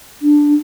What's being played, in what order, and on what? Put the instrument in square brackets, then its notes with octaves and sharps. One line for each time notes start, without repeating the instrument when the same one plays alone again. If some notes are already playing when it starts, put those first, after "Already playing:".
[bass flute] D4